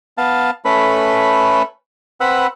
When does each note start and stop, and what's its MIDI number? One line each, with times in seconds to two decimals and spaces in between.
0.18 0.51 59
0.18 0.51 77
0.18 0.51 81
0.65 1.63 57
0.65 1.63 61
0.65 1.63 69
0.65 1.63 71
0.65 1.63 83
2.21 2.47 60
2.21 2.47 71
2.21 2.47 78
2.21 2.47 83
2.21 2.47 88